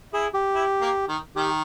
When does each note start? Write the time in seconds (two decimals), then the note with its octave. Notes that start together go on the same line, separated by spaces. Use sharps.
0.13 E4 G#4
0.34 G4
0.55 E4
0.81 A#3
1.09 D#3
1.36 D#3 G4